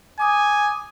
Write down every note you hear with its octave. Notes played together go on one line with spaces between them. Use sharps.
G#5 D6 D#6